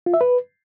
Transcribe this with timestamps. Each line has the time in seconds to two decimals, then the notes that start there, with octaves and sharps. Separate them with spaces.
0.06 F4
0.14 E5
0.21 B4